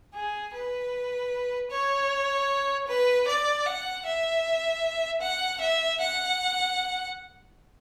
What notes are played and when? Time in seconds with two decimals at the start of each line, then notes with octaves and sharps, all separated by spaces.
0.14 G#4
0.53 B4
1.71 C#5
2.88 B4
3.27 D5
3.66 F#5
4.05 E5
5.21 F#5
5.61 E5
6.00 F#5